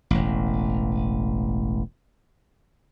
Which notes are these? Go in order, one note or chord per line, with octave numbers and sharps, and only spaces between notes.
E1 A1